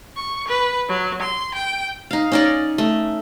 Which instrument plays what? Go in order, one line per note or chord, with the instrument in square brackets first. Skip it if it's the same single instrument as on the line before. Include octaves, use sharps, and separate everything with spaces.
[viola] C#6
B4
F#3
C6
G5
[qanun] D#4 F5
C#4 D#4 D5
A3